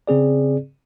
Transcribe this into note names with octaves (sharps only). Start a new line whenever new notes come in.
C#3 C4 G#4 D5